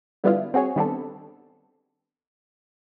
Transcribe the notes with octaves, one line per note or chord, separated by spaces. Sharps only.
D3 G3 B3 D4 E4 F4
C4 F#4 G#4 C#5
D#3 G3 B3 C4 D4 A4